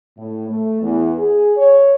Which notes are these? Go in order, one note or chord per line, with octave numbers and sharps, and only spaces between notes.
A2
A3
E2
G#4
C#5